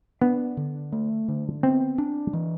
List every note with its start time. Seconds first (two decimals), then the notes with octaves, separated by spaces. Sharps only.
0.22 B3 D4
0.57 D3
0.92 A3
1.28 D3
1.63 B3 C4
1.98 D4
2.33 E3